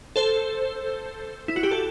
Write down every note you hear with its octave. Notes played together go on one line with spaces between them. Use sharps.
A4 C5
E4
F#4
G4
A4